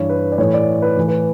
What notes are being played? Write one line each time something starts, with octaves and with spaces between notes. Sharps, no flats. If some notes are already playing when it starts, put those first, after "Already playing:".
Already playing: G2 E3 C#5
B4
D5
A2 E3 C#5
D5
B4
A2 E3
B4